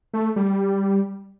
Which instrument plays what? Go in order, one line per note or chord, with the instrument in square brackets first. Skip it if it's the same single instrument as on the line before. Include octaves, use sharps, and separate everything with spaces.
[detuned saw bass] A3
G3